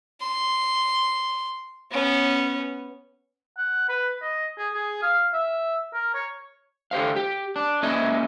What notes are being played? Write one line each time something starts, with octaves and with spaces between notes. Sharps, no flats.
C6
B3 C#4
F#5
B4
D#5
G#4
G#4
F5
E5
A#4
C#5
D3 G4 C5 F5
G4
D4
A#3 C#4 D#4 G#4 D#5 E5